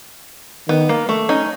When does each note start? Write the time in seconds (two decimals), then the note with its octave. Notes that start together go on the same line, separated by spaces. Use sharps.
0.69 D#3 B3
0.89 A#3
1.09 A3
1.29 C#4 D#4